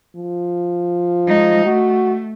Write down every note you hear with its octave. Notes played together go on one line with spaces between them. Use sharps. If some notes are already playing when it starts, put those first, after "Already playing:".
F3
G#3 D#4
A3 F#4